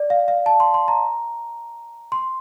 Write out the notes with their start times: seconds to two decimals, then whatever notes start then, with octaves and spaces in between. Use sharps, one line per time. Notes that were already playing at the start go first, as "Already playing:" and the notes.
Already playing: D5
0.10 F5
0.28 F5
0.46 A5
0.60 C6
0.74 C6
0.88 A#5
2.12 C6